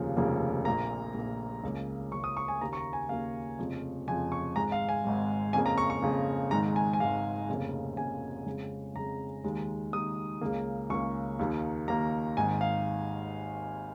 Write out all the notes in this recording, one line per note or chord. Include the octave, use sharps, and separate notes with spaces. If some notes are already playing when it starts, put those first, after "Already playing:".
Already playing: F1 D#2 C#3 F3 A#3
F1 D#2 C#3 F3 A#3
A#1 A#2 A#3 A#5
A#1 A#2 A#3
C#2 C#3 A#3
C#2 C#3 A#3 C#6
D#6
C#6
G#5
D#2 C#3 A#3 A#5
C#6
A#5
G#5
D#2 C#3 A#3 F5
F1 F2 C#3 F3
F1 F2 C#3 F3 G#5
C#6
G#1 G#2 G#3 A#5
F5
G#5
G#1 G#2 G#3
F2 C#3 A#3 G#5
A#5
C#6
C#6
F2 C#3 A#3
G#1 G#2 D#3 G#3 A#5
G#5
G#5
G#1 G#2 D#3 G#3 F5
F1 F2 C#3 A#3
F1 F2 C#3 A#3 G#5
F2 C#3 G#3
F2 C#3 G#3 A#5
D#2 D#3 G#3
D#2 D#3 G#3 D#6
C#2 C#3 A#3
C#2 C#3 A#3 C#6
D#2 D#3 A#3
D#2 D#3 A#3 A#5
G#1 G#2 D#3 G#5
F5